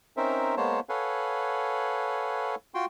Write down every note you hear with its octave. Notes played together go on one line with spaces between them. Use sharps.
C4 C#4 D#4 A#4 C5 E5
G#3 A#3 B3 C5 C#5 A5
A4 B4 C#5 F5 F#5 G#5
F4 F#4 G5 C6